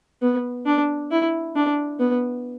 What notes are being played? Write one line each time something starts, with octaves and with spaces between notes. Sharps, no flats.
B3
D4
E4
D4
B3